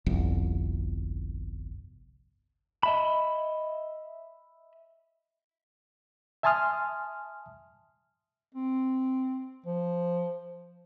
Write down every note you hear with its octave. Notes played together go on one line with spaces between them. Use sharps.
G1 C2 F2
D#5 E5 B5
E5 G#5 A5 C6 D#6 F6
C4
F3